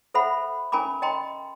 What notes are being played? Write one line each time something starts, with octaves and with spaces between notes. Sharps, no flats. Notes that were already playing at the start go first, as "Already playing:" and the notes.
A4 C5 E5 F#5 B5
C#4 A#4 G#5 A#5 B5 D6
D#5 G5 A#5 C6